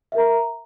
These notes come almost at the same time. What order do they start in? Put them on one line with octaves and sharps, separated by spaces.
E5 A#4 A#5